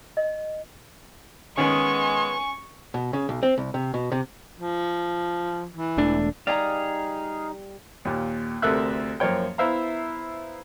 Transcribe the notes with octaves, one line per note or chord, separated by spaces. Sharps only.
D#5
D#3 G#3 B3 C#4 G#5 C#6
B2
C#3
B1
C4
C2
C3
B2
C3
F3
E3
E1 A3 D4
G3 D#4 G#4 D5 F5 A#5
D#2 A#2
D2 C3 A4 A#4 E5 F#6
F#2 F3 A#3 C#5 G5
B3 E4 C5 E5 F5 A#5